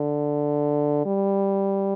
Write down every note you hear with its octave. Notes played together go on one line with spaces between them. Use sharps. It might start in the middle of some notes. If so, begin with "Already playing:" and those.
Already playing: D3
G3